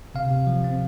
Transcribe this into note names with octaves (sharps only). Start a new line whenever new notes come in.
C3 F5
C3
F3
C4